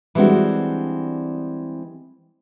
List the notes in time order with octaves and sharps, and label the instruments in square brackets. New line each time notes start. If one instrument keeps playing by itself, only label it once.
[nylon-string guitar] E3 G3 G#3 C4 D4 F#4